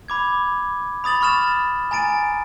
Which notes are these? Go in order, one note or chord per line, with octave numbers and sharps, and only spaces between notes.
B5 D6 G#6
B5 D#6 A6 F#7
B5 C#6 F6 A6 E7
G#5 A#5 A6 D7 D#7